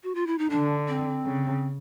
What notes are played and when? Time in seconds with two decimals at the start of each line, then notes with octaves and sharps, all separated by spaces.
0.03 F#4
0.15 F4
0.27 E4
0.38 D#4
0.50 D3 D4
0.88 C4
1.24 C#3